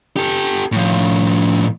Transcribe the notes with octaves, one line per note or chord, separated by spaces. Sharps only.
G4 A4
A2 F3